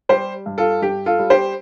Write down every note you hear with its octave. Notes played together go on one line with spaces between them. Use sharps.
G3 G4 C5
G2
F4 A4
G2 G4
F4 A4
G3
G4 C5